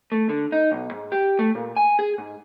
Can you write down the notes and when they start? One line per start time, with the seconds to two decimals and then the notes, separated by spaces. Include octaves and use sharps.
0.12 A3
0.29 D3
0.52 D#4
0.72 B1
0.91 G#2
1.12 G4
1.39 A3
1.55 A#2
1.77 G#5
1.99 G#4
2.18 G#2